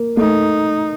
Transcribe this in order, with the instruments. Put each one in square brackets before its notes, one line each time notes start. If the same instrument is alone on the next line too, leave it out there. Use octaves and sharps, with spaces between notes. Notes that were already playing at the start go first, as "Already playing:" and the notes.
Already playing: [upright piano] A#3
[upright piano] A3 [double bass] D#4